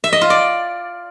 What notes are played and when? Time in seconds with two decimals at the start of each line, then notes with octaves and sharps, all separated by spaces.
0.04 E5
0.13 D#5
0.21 F4
0.30 D5